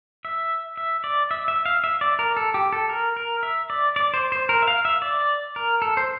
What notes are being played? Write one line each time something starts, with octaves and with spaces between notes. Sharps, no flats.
E5
E5
D5
E5
E5
F5
E5
D5
A#4
A4
G4
A4
A#4
A#4
E5
D5
D5
C5
C5
A#4
E5
F5
E5
D5
A#4
A4
C5